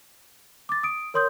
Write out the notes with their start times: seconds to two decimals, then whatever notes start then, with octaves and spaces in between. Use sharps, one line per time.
0.69 D6 A6
0.83 D#6 D7
1.14 A#4 C#5 C6 D#6 G6